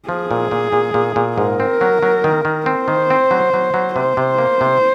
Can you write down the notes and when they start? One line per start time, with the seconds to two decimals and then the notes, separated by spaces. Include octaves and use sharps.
0.09 F3 G#4
0.31 A#2
0.51 A#2
0.73 A#2
0.94 A#2
1.16 A#2
1.37 G#2 A#4
1.60 C4
1.81 F#3
2.03 F#3
2.24 D#3
2.45 D#3
2.66 C4 C5
2.88 D#3
3.10 C4
3.31 F#3
3.53 F#3
3.74 F#3
3.96 C3 C5
4.17 C3
4.38 A#3
4.61 C3